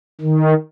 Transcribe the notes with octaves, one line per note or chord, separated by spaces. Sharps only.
D#3